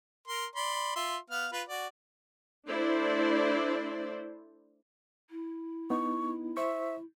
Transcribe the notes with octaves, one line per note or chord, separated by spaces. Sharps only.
A#4 C6
D5 B5 C6
F4 E5 C6
B3 F5 F6
F4 B4
F#4 D5
A3 D4 E4 C5 D5
E4
B3 D#4 C#6
C5 E5 C#6